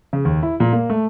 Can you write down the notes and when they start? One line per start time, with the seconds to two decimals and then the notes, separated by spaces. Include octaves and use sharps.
0.13 C#3
0.25 D#2
0.43 E4
0.60 A#2
0.73 A#3
0.90 A3